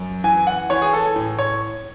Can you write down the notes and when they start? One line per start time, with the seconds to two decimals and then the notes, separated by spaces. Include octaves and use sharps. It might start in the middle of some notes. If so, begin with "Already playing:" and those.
Already playing: F#2
0.24 E3 G#5
0.47 F#5
0.70 E3 C#5
0.82 G#4
0.93 A4
1.16 A2
1.39 C#5